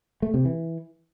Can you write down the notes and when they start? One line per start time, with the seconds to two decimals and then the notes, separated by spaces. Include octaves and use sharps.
0.22 A3
0.34 C3
0.45 E3